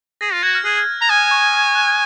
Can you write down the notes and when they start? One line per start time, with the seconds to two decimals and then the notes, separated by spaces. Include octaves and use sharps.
0.21 G#4 A#6
0.33 F4
0.43 F#4 G#6
0.55 F6
0.65 G#4 F#6
1.01 A#5
1.09 G#5 D#6
1.31 C#6
1.53 D#6
1.75 F#6